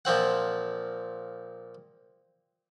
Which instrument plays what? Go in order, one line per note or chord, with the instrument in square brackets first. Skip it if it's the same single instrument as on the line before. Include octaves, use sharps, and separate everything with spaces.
[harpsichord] A#2 F3 C4 F#5